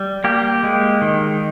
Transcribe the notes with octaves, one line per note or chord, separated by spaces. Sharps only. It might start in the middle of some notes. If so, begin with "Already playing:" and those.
Already playing: G3
A#3 G4
G#3
D#3